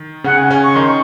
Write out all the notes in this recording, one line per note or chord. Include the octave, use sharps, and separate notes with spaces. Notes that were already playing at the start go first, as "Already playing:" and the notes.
Already playing: D#3
C#3 C#4 F#5
G#5
C#3 C#4
C#6
D#3 D#4 C6
C#6